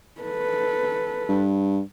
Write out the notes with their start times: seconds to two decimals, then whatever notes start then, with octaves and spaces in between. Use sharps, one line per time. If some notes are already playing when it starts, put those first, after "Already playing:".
0.22 A4 B4
1.29 G2